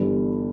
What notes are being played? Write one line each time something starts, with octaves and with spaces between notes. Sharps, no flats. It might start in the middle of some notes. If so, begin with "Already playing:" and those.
Already playing: G1 G2 E3 G3